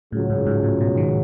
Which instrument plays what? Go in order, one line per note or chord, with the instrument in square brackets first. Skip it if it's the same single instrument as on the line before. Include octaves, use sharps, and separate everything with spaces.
[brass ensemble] C#2 C#3 F#3 [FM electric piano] A2
[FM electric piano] G#2
G#2
A2
B2
D#3